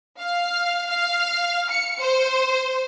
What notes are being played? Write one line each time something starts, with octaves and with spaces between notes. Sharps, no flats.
F5
F5
C#7
C5